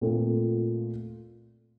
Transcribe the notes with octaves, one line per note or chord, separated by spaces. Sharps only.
A#2 A3 C4 F4